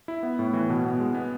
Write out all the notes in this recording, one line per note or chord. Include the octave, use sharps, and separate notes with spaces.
E4
B3
A2
E3
B2
B3
G#3
B3